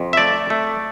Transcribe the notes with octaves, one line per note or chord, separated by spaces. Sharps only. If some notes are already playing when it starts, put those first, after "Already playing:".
Already playing: F2
E5
A3 D5
A3